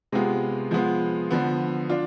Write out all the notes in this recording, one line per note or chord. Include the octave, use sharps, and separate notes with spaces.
C3 G#3 B3 F4
F3 G#3 B3 F4
D3 F3 B3
D4 F4